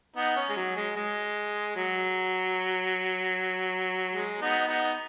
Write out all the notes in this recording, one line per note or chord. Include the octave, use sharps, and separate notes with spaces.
B3 D#4
C#4
G#3
F#3
G#3
G#3
F#3
G#3
B3 D#4
B3 D#4